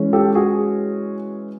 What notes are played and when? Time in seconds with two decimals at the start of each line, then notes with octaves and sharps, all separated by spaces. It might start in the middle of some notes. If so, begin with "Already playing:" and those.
Already playing: E3 G#3 C#4
0.13 G4 A4
0.35 F#4 G#4